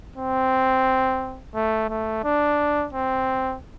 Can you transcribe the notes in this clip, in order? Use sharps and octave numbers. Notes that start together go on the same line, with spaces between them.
C4
A3
A3
D4
C4